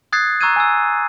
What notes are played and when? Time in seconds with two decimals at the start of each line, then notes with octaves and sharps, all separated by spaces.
0.13 D#6 F#6 G#6 A6 C7
0.41 A#5 C#6 E6 F#6 G#6 D#7
0.56 G#5 E6